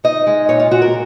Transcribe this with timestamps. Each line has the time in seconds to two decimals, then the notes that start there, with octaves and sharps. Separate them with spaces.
0.04 D#4 D#5
0.27 G#3
0.49 A#2 C#5
0.60 F4
0.71 A#2 F#4
0.82 A#4